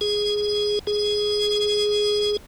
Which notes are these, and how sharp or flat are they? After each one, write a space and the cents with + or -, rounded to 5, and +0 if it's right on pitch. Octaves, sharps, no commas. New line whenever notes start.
G#4 +0
G#4 +5